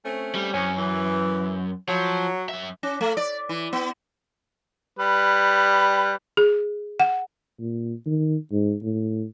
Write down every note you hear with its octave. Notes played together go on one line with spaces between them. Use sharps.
A3 C4 C#4
G3
F#2 E3 C4 C#4
E3
F3 F#3
F#2 E5
C#4
A3
D5
E3
B3
G3 B4
G#4
F#5
A#2
D#3
G#2
A2